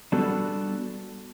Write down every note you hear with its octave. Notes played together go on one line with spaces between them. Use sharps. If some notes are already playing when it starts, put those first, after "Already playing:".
G3 B3 D4 F#4 A4